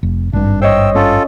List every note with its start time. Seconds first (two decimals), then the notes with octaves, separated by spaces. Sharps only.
0.03 F1
0.33 G#1 G2 D4
0.62 C5 C#5 D#5 G5 E6
0.95 C#4 F4 A4